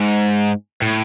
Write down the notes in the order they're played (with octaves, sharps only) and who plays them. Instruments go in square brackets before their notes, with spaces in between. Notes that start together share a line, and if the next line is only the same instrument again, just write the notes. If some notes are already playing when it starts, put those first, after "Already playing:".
Already playing: [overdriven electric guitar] G#2
A2